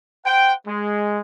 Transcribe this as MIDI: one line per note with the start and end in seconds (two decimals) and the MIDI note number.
0.25 0.52 72
0.25 0.52 78
0.25 0.52 79
0.66 1.20 56